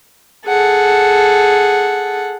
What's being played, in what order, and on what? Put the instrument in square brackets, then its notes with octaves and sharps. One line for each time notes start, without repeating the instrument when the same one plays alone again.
[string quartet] G#4 A4 F#5